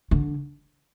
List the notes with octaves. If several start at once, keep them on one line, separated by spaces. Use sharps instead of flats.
D3